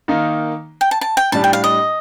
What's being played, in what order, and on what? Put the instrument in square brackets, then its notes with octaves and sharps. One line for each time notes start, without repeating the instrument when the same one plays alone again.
[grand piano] D#3 A#3 D#4
[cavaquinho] G5
A5
A5
G5
[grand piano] A2 G3 D4 [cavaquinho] A5
[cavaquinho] G5
F5
D#5